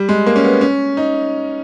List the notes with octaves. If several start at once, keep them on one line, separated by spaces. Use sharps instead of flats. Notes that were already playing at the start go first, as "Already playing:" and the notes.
Already playing: G3
G#3
A#3
C#4
B3
C#4
D#4